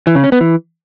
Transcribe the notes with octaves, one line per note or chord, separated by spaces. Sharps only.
E3
C#3
C#4
B3
E3